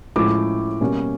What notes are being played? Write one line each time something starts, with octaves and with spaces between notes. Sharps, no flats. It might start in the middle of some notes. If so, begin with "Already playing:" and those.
A2 F3 G#3 C#4 D6
B2 G3 A#3 C#4